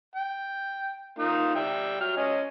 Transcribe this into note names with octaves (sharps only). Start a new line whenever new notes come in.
G5
A#3 D#4 F4
G3 E5 G5
F#3 F6
C#4 D#5 G#5